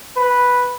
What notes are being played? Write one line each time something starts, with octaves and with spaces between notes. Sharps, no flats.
B4